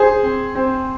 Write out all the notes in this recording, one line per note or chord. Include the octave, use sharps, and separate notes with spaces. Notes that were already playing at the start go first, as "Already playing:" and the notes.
Already playing: G#4 C5
C4
C4